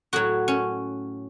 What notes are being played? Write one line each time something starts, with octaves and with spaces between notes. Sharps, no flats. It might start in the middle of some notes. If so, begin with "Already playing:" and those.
A2 F#3 F#4
C#4